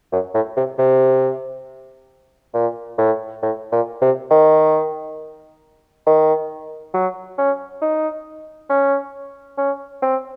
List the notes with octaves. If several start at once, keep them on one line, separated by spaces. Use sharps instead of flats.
F#2
A2
C3
C3
A#2
A2
A2
A#2
C3
D#3
D#3
F#3
C#4
D#4
C#4
C#4
C4